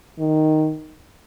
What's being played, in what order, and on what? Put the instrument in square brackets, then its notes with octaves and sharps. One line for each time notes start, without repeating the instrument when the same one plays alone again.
[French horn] D#3